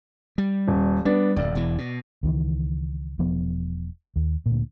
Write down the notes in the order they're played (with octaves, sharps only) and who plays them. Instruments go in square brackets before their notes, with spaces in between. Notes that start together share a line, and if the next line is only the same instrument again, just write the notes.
[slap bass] G3
[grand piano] D#1
[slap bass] G3 [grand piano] B3 D4
[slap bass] D1 F2 [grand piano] D5
[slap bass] E1 E2 E3
B2
[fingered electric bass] C#2 D#3 E3
E1 F3 B3
D#2
D2 A#2